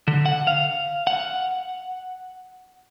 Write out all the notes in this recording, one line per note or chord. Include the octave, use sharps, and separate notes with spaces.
D3
F#5
F5
F#5